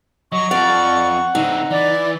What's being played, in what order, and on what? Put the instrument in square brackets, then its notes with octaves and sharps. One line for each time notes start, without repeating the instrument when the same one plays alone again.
[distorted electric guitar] F#3 [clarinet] D#5 [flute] C#6
[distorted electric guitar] F2 F5 [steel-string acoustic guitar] D5 [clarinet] F#5
[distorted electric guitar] D3 C4 [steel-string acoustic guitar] D#4
[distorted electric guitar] E3 [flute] D5